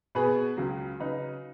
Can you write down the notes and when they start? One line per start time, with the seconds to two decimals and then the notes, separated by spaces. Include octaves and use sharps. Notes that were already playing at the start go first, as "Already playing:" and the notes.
0.15 B2 B3 G#4 B4
0.57 C#2 C#3 F#3
1.00 C#3 F#3 D#4 B4